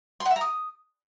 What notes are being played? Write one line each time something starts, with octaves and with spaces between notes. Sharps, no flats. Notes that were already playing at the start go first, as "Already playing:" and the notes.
C6
F#5
E5
A#5
D#6